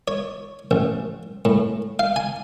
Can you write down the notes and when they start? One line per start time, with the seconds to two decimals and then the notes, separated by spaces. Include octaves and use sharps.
0.08 C#5
0.71 A1
1.45 A2
1.99 F5
2.16 G#5